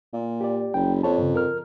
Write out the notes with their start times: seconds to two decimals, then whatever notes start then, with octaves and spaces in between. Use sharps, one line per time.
0.14 A#2
0.41 G4 D5
0.74 F#1 G5
1.03 F2 C#5 A5
1.18 G2 C#3
1.35 A#4 F6